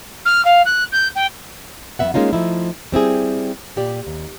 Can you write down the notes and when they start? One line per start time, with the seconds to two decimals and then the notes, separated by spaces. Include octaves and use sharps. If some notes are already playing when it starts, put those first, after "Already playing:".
0.25 F6
0.45 F5
0.65 F#6
0.92 G6
1.15 G5
1.99 F2 F#3 B3 E5 F#5
2.14 G#3 A#3 C#4 D#4 F4
2.33 F3 A3 D#4 E4
2.92 G3 C4 E4 G#4
3.76 A#2 G4 D5
4.07 D#2